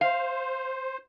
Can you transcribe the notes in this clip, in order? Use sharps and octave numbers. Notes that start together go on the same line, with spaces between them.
C5 F5